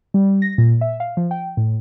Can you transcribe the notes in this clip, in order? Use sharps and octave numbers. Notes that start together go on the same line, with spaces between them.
G3
A#6
A#2
E5
F5
F3
G5
A2